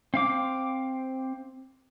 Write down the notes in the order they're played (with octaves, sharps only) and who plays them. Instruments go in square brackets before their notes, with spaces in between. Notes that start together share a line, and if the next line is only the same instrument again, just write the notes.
[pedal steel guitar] C4 F5 D6